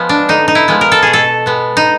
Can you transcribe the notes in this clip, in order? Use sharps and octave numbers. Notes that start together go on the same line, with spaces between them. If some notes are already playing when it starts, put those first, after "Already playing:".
Already playing: F3 G#3 B3
D4
D3 D#4
D#4
E4
F3 G#3 B3
A#4
A4
B2 G#4
A4
G#3 B3
D#4